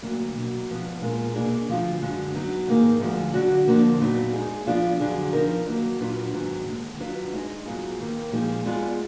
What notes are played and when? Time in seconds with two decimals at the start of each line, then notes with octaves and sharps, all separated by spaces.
0.02 D2 D3 F#3 A#3
0.35 B2 F#3 A#3
0.68 G#2 F3 B3 D4
1.02 A#2 G#3 B3 F4 A#4
1.35 B2 A#3 D4 G#4
1.68 D2 D3 F3 B3 F4
2.02 F#2 D3 G#3
2.35 F#3 B3 D#4
2.68 G#2 D#3 A#3 D#4 G#4
3.01 D2 D3 F3 G#3
3.34 D3 F#3 D4 F#4
3.67 F2 D3 F3 A#3
4.01 A#2 F#3 B3 D#4
4.34 G#3 D#4 G#4
4.67 F3 B3 D4 F4
5.00 F2 D3 F#3 D4 G#4
5.33 F3 B3 D#4 A#4
5.67 D#3 F#3 A#3
6.00 A#2 F#3 D4 F4 B4
6.33 G#2 D#3 F#3 B3
6.66 D#2 D3 G#3
6.99 D#3 F#3 D4 F4 B4
7.33 G#3 D#4 G#4 D#5
7.66 G#2 F#3 B3 F4 G#4
7.99 D#2 D#3 A#3
8.32 A#2 F3 G#3 D#4 G#4
8.66 G#3 B3 F4 G#4 D5